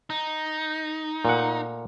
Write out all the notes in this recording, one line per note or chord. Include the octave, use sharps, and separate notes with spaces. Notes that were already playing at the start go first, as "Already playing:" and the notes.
D#4
A#2 A3 F#5